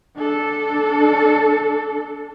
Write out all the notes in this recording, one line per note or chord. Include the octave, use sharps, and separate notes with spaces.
D4 A4